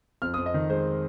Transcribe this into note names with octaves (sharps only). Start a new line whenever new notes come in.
F2 F6
F2 D#6
D#5
D#3
G#3 C5